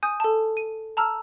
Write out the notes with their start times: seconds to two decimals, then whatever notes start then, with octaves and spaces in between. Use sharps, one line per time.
0.03 G#5 D#6 G6
0.20 A4 A5
0.57 D#7
0.97 A5 A#5 E6 F6